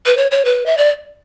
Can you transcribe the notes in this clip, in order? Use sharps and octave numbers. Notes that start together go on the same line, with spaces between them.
B4
C#5
C#5
B4
E5
D5